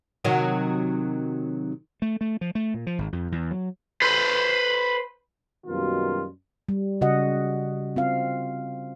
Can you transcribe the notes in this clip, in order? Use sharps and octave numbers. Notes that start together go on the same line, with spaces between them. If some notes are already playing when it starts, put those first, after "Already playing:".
C3 D#3 F#3
A3
A3
F3
A3
A#2
F3
G#1
F2
E2
F#3
B4 C5
F#2 B2 D#3 G3 A#3 F4
G3
C#3 F#4 D#5 F#5
C4 F4 F5